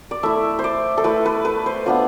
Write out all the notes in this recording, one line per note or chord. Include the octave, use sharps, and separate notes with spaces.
D5
A3 E4 E5
C5
D5
A4
A3 E4 B4
B4
B4
C5
B3 D4 F4 D5